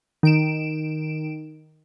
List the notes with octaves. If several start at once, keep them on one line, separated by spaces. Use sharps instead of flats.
D#3 D7 E7